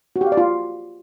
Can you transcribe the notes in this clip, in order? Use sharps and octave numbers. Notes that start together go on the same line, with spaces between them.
F#4
G4
F5
D5
F4